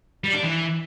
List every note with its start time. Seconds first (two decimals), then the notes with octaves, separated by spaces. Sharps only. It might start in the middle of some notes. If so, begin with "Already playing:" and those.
0.24 G3
0.34 D4
0.43 E3